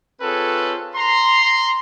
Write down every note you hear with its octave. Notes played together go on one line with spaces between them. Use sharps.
C4 F4 G#4 A4 B4 C#5
A#5 C6